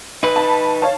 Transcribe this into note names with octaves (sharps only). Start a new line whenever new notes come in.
D#4 B4
A5 B5
C#5 F5 A5